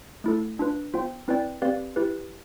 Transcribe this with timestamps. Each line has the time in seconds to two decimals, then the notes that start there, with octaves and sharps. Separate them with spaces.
0.24 A3 E4 A4
0.59 D4 F4 B4
0.94 B3 F4 C5 G5
1.28 C4 E4 B4 D5 G5
1.62 C4 G4 B4 D5 F5
1.96 E4 G4 B4